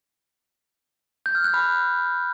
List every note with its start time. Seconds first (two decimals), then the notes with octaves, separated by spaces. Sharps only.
1.26 G6
1.35 F6
1.44 F#6
1.54 B5